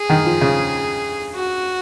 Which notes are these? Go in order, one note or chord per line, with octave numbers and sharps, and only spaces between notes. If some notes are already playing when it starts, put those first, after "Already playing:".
Already playing: G#4
D#3
F3
C#3
F#4